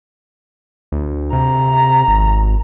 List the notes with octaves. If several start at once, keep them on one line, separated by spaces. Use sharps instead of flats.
D2
C3 A#5
G#1